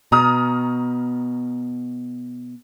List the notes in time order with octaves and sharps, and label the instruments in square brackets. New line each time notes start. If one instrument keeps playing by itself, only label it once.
[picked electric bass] B2 [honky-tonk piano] A#5 D#6 F6